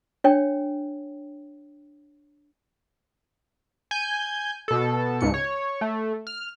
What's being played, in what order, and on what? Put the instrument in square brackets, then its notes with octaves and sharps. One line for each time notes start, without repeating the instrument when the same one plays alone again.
[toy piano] D4 C#5 G5
[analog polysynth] G#5 G6
B2 A4
C#2 G#2 C#7
C#5
A3
F6